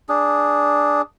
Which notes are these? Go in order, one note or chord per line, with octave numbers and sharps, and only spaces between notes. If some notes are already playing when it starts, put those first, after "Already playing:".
D4 G#4